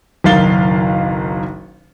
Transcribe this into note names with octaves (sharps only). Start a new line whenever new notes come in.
F#1 B1 D#3 F5 A6 G7